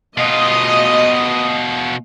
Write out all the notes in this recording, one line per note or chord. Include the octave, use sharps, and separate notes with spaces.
B2 F4 D#5